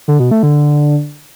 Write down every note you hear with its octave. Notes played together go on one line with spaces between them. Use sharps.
D3
B2
A3
D3